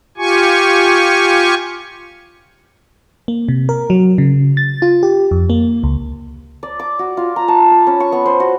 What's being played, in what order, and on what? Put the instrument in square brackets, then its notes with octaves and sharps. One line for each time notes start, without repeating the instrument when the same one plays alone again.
[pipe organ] F4 G4 G#5 C#6
[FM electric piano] A#3
C3
A#4
F#3
C#3
A6
F4
G4
F2
A#3
C#2
[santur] D5
D6
F#4
F4
A#5
A5
B5
C#4
C#6
B3
C5
F#4